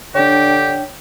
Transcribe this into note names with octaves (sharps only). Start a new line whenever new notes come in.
D3 D4 G4 C#5 G5